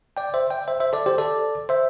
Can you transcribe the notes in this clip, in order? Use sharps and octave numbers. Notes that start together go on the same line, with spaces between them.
D5 G5
C5 E5
D5 G5
C5 E5
C5 E5
A4 D5
G4 C5
A4 D5
C5 E5